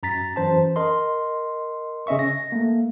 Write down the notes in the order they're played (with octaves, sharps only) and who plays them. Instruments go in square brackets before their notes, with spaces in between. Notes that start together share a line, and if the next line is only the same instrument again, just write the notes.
[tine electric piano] F#2 A#5 A6 B6
F#2 E3 C5 A5
A#4 D#5 C6
C#3 C#4 D#5 E5 C#6
A#6
A3 A#3